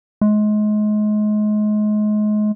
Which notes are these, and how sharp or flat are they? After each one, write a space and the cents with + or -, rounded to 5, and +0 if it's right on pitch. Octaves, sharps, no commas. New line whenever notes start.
G#3 +30